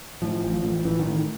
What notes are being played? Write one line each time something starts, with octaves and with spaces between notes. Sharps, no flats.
A2 F3
A1
F3
A1
A1 E3
D#3
A2